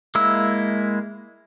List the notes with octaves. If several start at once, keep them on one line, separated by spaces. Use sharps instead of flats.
G#3 A#3 E4 E6